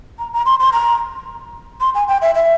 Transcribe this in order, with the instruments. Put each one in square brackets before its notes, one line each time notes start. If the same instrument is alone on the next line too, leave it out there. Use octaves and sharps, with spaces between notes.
[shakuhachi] A#5
A#5
C6
C6
A#5
C6
G#5
G5
E5
E5